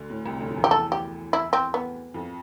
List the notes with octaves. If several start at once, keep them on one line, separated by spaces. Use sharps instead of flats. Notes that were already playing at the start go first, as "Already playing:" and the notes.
Already playing: D2 D3
A2
C2 C3
D2 D3
F3
E2 E3
G4
A4
G4
E4
C4
B3
F2 F3